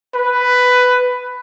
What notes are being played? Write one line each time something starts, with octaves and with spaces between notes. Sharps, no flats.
B4